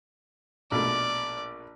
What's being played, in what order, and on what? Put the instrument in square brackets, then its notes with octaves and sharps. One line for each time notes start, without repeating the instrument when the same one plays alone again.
[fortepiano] A#1 B2 A3 [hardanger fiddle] D5